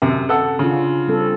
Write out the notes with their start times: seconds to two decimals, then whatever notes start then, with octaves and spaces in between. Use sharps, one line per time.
0.02 F#2 C3
0.29 A4 F#5 E6
0.59 C#3 C#4 D4 F4
1.08 G3 C4 A4